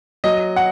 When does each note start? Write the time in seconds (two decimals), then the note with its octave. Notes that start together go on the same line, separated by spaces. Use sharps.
0.24 F#3 D#5
0.56 F#5